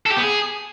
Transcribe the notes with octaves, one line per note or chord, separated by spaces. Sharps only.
A4
G4
B3
G#4